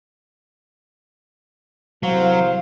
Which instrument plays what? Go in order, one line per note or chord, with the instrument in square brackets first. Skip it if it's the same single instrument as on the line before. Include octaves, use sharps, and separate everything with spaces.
[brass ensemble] C2 C5 F5 [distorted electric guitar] F#3